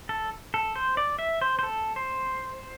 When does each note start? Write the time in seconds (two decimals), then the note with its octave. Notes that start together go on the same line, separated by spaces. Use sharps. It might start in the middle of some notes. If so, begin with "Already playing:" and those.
0.09 A4
0.54 A4
0.76 C5
0.97 D5
1.19 E5
1.41 C5
1.59 C5
1.63 A4
1.96 C5